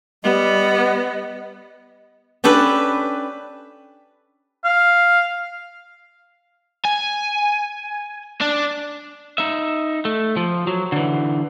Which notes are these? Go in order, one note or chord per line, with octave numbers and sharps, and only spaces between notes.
G3 B3 D#5
C#4 D4 G4 A4 B4
F5
G#5
D4
D#4 E5
A3
F3
F#3
D3 E3